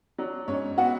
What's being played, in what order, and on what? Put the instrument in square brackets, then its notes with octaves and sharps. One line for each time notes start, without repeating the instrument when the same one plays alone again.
[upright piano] F#3 D4
G#2 C#4 C#5
B3 F#4 F#5